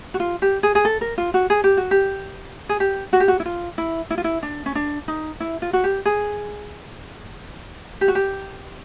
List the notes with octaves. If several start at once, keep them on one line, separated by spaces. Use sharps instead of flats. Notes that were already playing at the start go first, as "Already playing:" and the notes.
F#4
F4
G4
G#4
G#4
A4
A#4
F4
F#4
G#4
G4
F#4
G4
G#4
G4
F#4
G4
F#4
E4
F4
E4
E4
F4
E4
D4
C#4
D4
D#4
E4
F4
F#4
G4
G#4
G4
F#4
G4